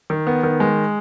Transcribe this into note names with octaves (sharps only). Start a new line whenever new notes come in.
D#3
B3
D#3
G#3